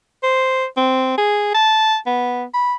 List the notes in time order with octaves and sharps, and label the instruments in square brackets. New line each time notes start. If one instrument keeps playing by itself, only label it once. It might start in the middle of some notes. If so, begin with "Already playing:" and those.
[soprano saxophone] C5
C4
G#4
A5
B3
B5